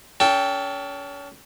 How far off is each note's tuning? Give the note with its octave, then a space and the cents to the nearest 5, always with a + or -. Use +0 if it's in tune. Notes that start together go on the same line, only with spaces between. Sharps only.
C#4 +35 A4 +0 G5 +0